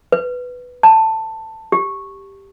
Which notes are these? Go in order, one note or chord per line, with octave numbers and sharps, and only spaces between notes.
B4
A5
G4